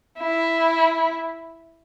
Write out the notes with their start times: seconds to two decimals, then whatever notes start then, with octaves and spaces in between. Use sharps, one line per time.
0.19 E4